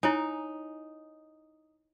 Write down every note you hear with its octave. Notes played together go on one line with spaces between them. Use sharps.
D#4 E4 C#5 G#5